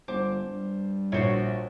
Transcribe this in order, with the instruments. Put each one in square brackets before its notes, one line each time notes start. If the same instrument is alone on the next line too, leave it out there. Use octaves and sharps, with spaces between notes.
[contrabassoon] G1 [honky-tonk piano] C5 [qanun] D6
[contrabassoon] G2
[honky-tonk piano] A#1 [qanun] F#4 C5 C#5